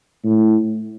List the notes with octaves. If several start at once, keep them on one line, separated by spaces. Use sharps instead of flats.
A2